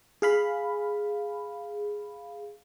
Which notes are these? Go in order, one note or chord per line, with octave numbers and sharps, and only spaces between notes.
G#4 F5 B5